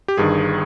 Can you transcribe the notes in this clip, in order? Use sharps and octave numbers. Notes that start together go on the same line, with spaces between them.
G4
G1 G2 D#3 G#4